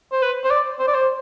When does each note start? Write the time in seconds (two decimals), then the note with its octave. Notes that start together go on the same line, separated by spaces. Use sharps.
0.12 C5
0.22 B4
0.44 C5
0.51 D5
0.79 C5
0.87 D5
0.95 C5